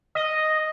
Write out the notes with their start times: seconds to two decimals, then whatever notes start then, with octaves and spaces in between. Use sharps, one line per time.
0.15 D#5